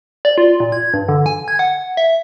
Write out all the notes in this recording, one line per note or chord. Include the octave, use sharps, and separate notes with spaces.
D5
F4
A#2
G#6
G2
D3
G#5
G#6
F#5
E5